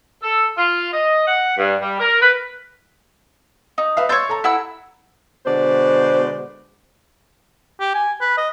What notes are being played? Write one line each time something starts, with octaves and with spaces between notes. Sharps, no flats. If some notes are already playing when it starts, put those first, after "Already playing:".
A4
F4
D#5
F#5
G2
G3
A#4
B4
D#4
B4 E5 F5
C#5 C6 E6 G6 A6
A4 A#5
E4 F#5 E6
B2 D3 G#3 B4 C5 D5
G4
G#5
B4
D#5